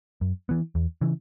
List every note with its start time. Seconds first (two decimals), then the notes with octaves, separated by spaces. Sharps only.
0.21 F#2
0.49 E3 B3
0.75 E2
1.01 C#3 E3